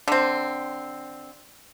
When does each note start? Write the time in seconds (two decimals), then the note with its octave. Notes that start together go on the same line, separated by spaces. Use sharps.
0.08 D3 C4